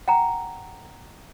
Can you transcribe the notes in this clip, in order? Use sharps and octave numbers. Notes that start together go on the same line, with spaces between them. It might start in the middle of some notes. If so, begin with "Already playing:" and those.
F#5 G5 A#5